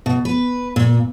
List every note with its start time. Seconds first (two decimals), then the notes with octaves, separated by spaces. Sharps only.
0.06 B2
0.25 B4
0.76 A#2